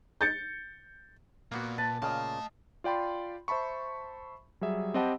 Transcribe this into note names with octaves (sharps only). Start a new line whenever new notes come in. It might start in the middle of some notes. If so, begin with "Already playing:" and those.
G6 A6 C#7
A#2 A#3 B3 F#4
B4 A5
A#2 C#3 A3 D#5 F5 G5 A5
F4 D5 G5 B5 C6
C5 E5 A5 B5 C#6
F#3 G3 G#4 E5
C4 G4 D#5 F#5 A5 B5